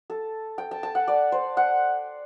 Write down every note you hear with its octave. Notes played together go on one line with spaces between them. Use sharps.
A4
G5
A5
A5
F#5
D5
C5
F#5